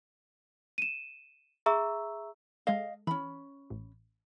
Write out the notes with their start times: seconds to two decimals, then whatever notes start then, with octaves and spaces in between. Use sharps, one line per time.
0.78 D#7 E7
1.66 G#4 E5 A#5 C#6 E6
2.67 G#3 A4 D#5 F5
3.07 E3 C#4 B5
3.70 A1